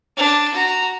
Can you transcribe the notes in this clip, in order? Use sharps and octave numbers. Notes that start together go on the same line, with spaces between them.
D4
F#4 A#5